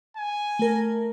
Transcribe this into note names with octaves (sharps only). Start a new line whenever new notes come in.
G#5
A3 A#4